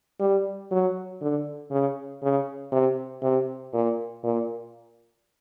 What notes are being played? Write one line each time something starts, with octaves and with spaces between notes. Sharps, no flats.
G3
F#3
D3
C#3
C#3
C3
C3
A#2
A#2